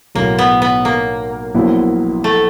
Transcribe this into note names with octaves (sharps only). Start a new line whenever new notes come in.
B1 A2 F#3 A#3
B3
B3
A#3
A#1 A#2 F#3 B3 E4
A3